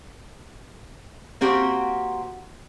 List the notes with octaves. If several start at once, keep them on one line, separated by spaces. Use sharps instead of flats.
A#3 C4 F#4 G4